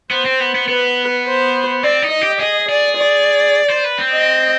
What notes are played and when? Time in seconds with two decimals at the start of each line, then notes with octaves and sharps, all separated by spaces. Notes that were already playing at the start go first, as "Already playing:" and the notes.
0.11 B3 C5
0.25 C4
0.40 B3
0.55 B3
0.68 B3 B4
1.26 C5
1.83 C4 D5
2.03 D#4
2.11 D#5
2.21 G4
2.40 G#4 D#5
2.69 G#4 D5
2.97 D5
3.70 C5
3.84 B4
3.98 C4
4.12 D#5